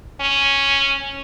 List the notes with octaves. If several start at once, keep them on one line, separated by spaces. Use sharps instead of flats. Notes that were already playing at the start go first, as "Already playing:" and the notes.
C#4